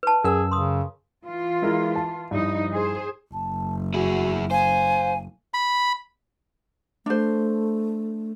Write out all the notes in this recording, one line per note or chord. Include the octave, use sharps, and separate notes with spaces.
B4 A5
F#2 G#4 A#4 E6
C#3 C6 D#6
E3 F4
G#3 E4 A#4
A5
G2 F3 D#4 E4
G#4 C5
F#1 A5
E4 F#4 G#4
C5 F5 G#5
B5
A3 D4 C5